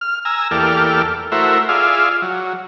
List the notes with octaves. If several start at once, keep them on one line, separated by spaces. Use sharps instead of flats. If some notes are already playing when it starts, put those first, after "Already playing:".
F6
G#5 A#5 E6
E2 A#3 G4 A4 D5 F6
A3 E4 F#4 A#4 C5 E5
F4 G#4 D5 E5 F5
F#3